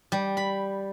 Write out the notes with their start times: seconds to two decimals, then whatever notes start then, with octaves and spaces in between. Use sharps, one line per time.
0.12 G3
0.37 B5